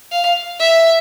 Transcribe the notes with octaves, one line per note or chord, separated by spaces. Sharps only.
F5
E5